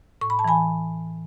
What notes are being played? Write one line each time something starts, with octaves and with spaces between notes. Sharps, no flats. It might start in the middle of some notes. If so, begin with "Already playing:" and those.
A2 C#6
B5
A5
E3 G#5 B5